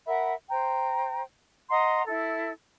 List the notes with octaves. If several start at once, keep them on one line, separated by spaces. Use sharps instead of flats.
A#4 E5 F#5 B5
C5 G5 A#5
D#5 F#5 A#5 C6
E4 A4